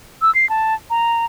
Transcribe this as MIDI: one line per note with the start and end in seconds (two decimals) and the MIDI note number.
0.22 0.33 88
0.35 0.48 96
0.50 0.74 81
0.90 1.25 82